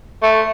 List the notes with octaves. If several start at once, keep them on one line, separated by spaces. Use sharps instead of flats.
A3